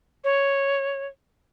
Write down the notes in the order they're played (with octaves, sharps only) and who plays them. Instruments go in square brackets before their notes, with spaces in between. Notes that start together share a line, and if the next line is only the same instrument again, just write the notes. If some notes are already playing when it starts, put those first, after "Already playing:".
[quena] C#5